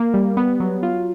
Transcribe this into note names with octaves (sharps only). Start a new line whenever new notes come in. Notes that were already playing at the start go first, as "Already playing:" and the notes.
Already playing: A#3
G3
B3
F#3
F4